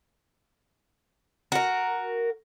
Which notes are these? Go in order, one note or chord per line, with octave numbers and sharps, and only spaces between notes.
F#4 A#4